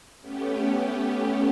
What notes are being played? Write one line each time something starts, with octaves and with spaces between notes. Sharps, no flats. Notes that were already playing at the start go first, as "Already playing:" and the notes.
A3 B3 C#4 G4